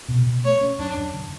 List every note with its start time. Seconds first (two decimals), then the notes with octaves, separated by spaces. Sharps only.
0.08 B2
0.26 B2
0.44 A3 C#5
0.61 C#4
0.79 F#2 D4
0.97 F#2
1.14 D3